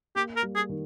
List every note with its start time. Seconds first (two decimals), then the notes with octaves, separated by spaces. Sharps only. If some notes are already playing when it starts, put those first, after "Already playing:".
0.16 A#3 G4
0.36 A#4
0.42 G3
0.55 G#4
0.69 D#3